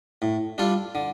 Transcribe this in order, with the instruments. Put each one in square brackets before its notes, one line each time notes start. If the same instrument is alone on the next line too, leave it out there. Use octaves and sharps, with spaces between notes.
[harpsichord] A2
G3 D4 F4 A4
D3